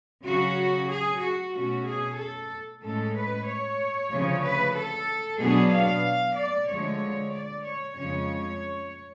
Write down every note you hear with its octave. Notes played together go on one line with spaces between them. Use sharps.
C#3 F#3 C#4 F#4
G#4
F#4
B2 A3 C#4 F#4
G#4
A4
A2 G#3 C#4 A4
B4
C#5
D2 C#3 F3
B4
A4
B2 F#3 B3 D4 G#4
F5
D5
D2 D3 F3 G#3 C#5
D5
C#5
F2 C#3 G#3 C#4 C#5